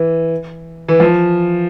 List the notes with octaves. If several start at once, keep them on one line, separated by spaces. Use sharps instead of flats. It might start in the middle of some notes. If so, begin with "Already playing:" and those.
Already playing: E3
E3
F3